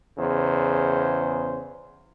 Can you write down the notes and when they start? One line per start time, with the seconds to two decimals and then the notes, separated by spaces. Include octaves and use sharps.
0.18 E2 C#3 C5